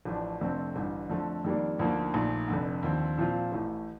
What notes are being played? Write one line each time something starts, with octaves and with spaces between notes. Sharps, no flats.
A1 A2 F3 A3 D4
F1 F2 D3 A3 C4
A1 G2 D3
F2 D3 F3 A3
F2 D#3 G3 A#3 D4
D2 D3 F3 A#3 D#4
A#1 A#2 A3 D#4
F1 F2 D3
D#2 D3 F3 C4
A#2 F3 C4 F4
A1 A2 A3